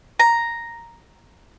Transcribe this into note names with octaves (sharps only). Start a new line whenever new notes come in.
A#5